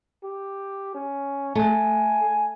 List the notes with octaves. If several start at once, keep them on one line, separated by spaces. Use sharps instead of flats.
G4
C#4
A3 G#5